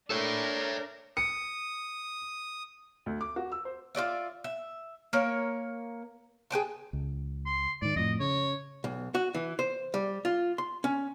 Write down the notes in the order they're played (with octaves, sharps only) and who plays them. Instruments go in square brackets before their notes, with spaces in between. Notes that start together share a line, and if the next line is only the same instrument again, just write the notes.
[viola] D4 A#4 [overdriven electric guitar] A4 C#5
[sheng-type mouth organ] D#6 [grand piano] C#7
[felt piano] D2
D6
F#4
E6
C5
[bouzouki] F4 G4 D5 E5
E5
A#3 A#4 C#5
G#4 B4 G5 A5
[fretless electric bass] C#2
[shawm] C6
[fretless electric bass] G#2 D#3 [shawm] D5
[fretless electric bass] F2 A2 [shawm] D#5
[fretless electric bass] C#3 [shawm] C#5
[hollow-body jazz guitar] B1
F#4
E3
C5
G3
F4
C6
C#4